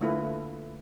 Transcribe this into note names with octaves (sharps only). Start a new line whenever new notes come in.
D3 A3 A#3 E4 F4 B4